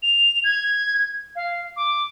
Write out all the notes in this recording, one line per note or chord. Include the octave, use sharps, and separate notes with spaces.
F7
G#6
F5
D6